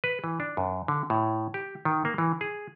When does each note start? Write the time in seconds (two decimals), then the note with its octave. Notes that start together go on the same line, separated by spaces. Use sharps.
0.04 B4
0.24 E3
0.40 D4
0.57 F#2
0.88 D3
1.10 A2
1.54 G4
1.85 D#3
2.05 A#3
2.18 E3
2.41 G#4